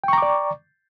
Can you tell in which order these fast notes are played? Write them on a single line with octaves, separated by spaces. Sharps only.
G5 C#6 A#5 D6 D5